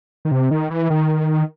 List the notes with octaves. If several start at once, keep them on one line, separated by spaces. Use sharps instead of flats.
D#3
C3
D#3
E3
D#3